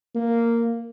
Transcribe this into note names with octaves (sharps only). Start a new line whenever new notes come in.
A#3